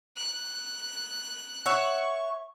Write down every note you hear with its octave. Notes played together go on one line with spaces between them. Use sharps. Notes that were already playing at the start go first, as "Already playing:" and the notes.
F#6
C#5 E5 F#5 C#6